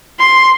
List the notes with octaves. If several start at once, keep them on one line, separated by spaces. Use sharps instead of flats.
C6